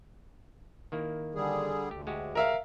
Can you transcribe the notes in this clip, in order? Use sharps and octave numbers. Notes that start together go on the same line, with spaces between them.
D#3 A#3 E4
D3 G3 G#4
D2 A3 G4
G#3 F#4 G4
A#4 E5 F5